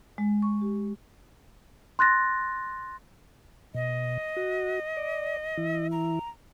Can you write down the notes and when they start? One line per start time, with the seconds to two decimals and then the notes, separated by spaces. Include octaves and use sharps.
0.18 G#3
0.42 C#6
0.61 G4
1.99 C6 F#6 A6 A#6
3.75 B2 D#5
4.37 F#4
4.97 D5
5.57 E3 E4
5.92 A#5